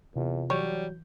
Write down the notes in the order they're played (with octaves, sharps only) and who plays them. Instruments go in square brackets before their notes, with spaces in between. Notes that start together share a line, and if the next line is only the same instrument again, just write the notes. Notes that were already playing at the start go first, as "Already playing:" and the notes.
[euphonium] E2 [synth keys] C3 F4
[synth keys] E3 G6 [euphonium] F#3 [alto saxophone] G3 [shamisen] C#5